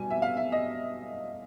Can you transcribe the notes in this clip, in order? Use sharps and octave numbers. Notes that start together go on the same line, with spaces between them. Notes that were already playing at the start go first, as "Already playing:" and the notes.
Already playing: B2 G3 G#5
E5
F5
E5
D#5